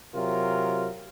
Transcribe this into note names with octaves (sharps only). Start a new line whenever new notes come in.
C3 F#3 F4 A#4